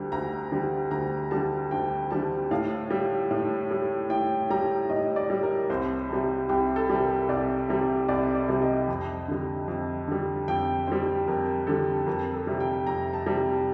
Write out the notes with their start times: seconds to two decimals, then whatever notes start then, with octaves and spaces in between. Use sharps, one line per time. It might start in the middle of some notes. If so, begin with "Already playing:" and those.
Already playing: D2 D3 G3
0.12 D2 A#5
0.51 D3 G3
0.91 D2 A#5
1.31 D3 G3 A5
1.71 D2 G5
2.11 D3 G3 A5
2.51 A2 F5
2.90 G3
3.31 A2
3.71 G3
4.10 A2 G5
4.50 G3 A#5
4.89 A2 D#5
5.16 D5
5.30 G3
5.43 A#4
5.70 C2 C5
6.09 C3 G3
6.49 C2 G4
6.76 A4
6.90 C3 G3
7.02 A#4
7.29 C2 D5
7.68 C3 G3
8.09 C2 D5
8.35 D5
8.48 C3 G3
8.62 D#5
8.88 F2
9.28 D3 G3
9.68 F2
10.08 D3 G3
10.48 F2 G5
10.87 D3 G3 C5
11.28 F2 A#4
11.67 D3 G3 A4
12.06 F2 A#4
12.33 A4
12.47 C3 G3
12.60 G5
12.87 F2 A#5
13.13 A5
13.26 C3 G3